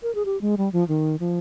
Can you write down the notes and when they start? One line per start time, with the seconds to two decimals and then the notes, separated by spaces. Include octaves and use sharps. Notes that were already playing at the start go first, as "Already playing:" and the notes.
0.03 A#4
0.15 G#4
0.25 G4
0.41 G#3
0.57 G3
0.73 F3
0.88 D#3
1.20 F3